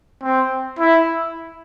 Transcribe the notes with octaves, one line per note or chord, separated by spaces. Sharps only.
C4
E4